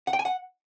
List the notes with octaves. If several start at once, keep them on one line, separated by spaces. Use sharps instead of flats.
F#5
G5
G#5
F#5